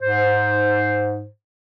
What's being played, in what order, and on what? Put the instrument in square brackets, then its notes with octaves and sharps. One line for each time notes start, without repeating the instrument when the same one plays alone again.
[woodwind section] G#2 C5